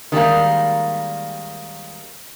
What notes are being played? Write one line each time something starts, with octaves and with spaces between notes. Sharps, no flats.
D#3 G3 G#3 A#3